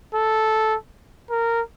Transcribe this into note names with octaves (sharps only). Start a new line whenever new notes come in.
A4
A#4